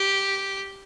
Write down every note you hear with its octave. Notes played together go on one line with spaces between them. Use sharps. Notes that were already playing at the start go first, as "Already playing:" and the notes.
Already playing: G4